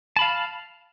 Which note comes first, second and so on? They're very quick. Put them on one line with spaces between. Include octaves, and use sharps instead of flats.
A5 B5 F5